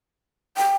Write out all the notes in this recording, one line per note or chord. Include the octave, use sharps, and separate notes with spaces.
G5